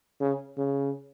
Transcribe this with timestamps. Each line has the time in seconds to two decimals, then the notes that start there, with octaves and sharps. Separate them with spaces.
0.21 C#3
0.58 C#3